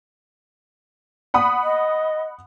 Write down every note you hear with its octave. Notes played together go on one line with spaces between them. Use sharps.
F#5 B5 D#6
D#5